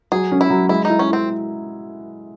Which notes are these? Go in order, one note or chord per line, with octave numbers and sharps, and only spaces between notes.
F#3 G#4
C#4
E4
F#3
G#3 E4
D#4 E4
C#4
C4 E4